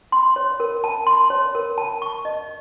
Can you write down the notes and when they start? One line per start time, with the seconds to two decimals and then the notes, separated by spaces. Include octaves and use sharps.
0.12 C6
0.36 C#5
0.60 A#4
0.84 A5
1.07 C6
1.30 C#5
1.55 A#4
1.78 A5
2.02 C#6
2.25 D#5